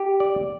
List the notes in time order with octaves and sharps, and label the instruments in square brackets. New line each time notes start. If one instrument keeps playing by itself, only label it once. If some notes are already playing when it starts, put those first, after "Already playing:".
Already playing: [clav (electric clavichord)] G4
D5